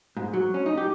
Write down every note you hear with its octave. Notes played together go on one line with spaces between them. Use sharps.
G#2
F#3
C#4
D#4
G4